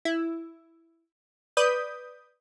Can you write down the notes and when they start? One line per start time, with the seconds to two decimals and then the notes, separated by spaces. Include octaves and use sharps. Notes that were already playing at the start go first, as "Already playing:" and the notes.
0.05 E4
1.57 B4 D5 D#6 G6